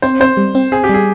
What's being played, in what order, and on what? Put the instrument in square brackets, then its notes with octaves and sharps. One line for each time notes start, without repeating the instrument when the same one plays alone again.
[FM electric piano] C4 [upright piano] C5
[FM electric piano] C4 [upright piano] C5
[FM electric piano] G3
C4
[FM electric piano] C4 [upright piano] G#4
[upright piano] G4
[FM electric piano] G3 [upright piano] G#4